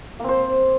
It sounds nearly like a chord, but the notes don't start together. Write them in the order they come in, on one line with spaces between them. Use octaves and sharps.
A#3 C4 C5